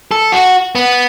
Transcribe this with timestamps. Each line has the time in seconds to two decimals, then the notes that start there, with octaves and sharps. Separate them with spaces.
0.11 A4
0.32 F#4
0.75 B3